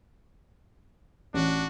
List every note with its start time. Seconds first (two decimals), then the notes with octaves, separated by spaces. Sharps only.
1.34 A1 D4 F#4